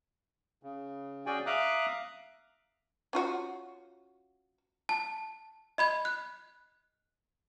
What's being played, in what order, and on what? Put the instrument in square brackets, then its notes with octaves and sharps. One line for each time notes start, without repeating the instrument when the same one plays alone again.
[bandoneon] C#3
C#4 F#4 G#4 D5 G5 G#5
E5 F5 A#5 D6 D#6 F#6
[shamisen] C#4 F4 F#4
[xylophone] A5
D#5 B5 G#6
F#6